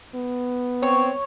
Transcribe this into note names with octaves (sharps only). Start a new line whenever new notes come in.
B3
C4 C#5